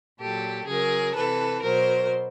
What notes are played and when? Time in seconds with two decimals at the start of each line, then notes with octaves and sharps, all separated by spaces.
0.19 A#2 F#3 G4 A4
0.67 C#3 F#3 G#4 A#4
1.15 C3 E3 A4 B4
1.63 B2 F#3 A#4 C5